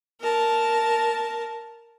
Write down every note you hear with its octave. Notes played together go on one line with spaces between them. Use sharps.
A#4 A5